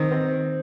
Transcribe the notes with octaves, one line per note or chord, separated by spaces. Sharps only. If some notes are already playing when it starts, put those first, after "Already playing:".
Already playing: D#3 C4
C4